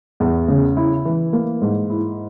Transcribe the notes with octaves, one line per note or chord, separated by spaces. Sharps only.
E2
C#3
E4
E3
A#3
G#2
E4